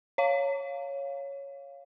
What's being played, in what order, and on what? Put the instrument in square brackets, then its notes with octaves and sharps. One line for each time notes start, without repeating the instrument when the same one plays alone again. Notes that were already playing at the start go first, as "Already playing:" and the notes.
[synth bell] C#5 F5